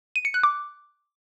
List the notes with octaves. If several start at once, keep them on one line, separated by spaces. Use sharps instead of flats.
D#7
C#7
F#6
D6